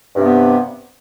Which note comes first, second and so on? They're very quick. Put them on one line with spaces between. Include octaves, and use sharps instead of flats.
G2 C3 B3